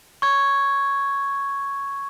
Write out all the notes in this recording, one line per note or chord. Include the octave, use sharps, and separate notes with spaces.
C#6 G#6